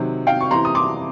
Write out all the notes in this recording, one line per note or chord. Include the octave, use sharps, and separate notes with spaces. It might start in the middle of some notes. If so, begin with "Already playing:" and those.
Already playing: C3 D#3 F#3
F5 G5
C#6
C3 E3 A#5 C6
D#6
C6 D6